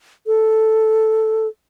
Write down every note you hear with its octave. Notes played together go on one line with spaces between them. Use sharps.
A4